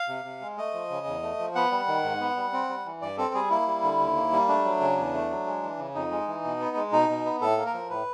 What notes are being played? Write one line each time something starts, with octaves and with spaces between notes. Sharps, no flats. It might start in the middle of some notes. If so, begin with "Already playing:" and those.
Already playing: F5
C3
C3
G#3
A3 D#5
F3
C#3
E2
A3
F3
B3 F#5
G3
D#3
G#2
B3
G3
C4
G3
E3
G2 D5
C4 A4
G3 G#4
A#3 E4
G3
D3
D#2
A#3
G3
A3 D4
F#3
C#3
E2
A3
F#3
G#3
E3
C#3
F2 D#4
G#3
E3
B2
B3
G#3
B2 D#4
B2
B3
A2 A4
A#3
A#4
F3
A2 B4